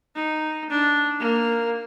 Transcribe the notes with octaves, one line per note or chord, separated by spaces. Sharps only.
D#4
D4
A#3